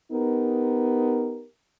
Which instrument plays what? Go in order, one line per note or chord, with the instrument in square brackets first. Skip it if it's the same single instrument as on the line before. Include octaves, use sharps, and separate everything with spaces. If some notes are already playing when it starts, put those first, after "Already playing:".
[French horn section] B3 D#4 G4 A#4